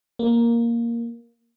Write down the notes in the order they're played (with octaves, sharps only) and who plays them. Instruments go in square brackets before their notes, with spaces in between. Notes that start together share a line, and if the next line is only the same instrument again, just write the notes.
[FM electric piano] A#3